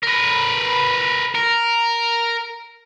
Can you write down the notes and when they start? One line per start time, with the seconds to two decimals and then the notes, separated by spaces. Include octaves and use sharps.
0.03 A#4 B4
1.35 A#4